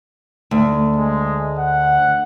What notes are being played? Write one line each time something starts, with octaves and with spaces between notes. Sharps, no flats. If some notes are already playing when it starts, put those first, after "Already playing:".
D2
G#3
F#5